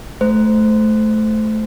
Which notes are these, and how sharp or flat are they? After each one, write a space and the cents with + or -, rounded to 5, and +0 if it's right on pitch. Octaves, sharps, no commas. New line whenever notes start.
A3 -20 C5 -20